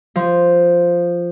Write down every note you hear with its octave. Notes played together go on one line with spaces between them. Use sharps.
F3